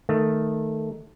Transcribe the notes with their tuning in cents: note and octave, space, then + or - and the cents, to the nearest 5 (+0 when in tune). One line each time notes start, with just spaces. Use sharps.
D#3 +0 A3 +0